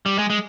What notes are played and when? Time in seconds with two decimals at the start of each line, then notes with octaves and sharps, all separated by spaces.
0.06 G3
0.18 G#3
0.30 G#3